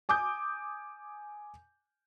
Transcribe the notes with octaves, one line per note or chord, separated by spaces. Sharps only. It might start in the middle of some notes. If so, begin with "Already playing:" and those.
G#5 D6 D#6 G6